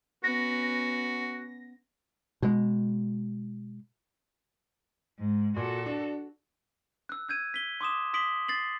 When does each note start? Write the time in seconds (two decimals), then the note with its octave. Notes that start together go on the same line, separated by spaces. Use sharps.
0.24 B3 C#4 F#4 A#6
2.42 B2 G#3
5.20 G#2
5.56 A#2 F#4 A4
5.86 D4
7.09 E6 F#6
7.29 E6 G6 G#6 D#7
7.54 B6 G7
7.81 C6 D6 D#6 E7
8.13 C6 D#6 B6 D7 F#7 G7
8.48 A6 C7 F#7